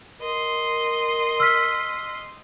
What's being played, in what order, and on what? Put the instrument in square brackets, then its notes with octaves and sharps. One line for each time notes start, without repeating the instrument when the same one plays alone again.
[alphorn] A#4 [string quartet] D#5 C6
[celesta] E6 F6 B6